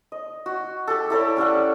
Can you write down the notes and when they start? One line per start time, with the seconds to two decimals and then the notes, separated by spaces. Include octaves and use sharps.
0.12 D#5
0.46 F#4
0.87 G4 A4
1.10 E4 A4 C#5 D5
1.37 C#4 G4 A4 F#5